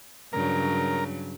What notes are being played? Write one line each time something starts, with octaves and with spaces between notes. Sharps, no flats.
G2 C#3 F#3 A#4